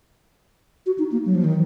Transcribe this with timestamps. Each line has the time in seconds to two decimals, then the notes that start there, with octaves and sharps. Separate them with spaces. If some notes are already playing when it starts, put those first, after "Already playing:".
0.86 F#4
0.99 D#4
1.12 A#3
1.26 F#3
1.35 F3
1.44 D#3